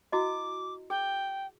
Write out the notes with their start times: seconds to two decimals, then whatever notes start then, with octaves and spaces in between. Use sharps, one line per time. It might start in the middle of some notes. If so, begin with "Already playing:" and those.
0.12 E4 F#4 D#5 D6
0.90 G#4 G5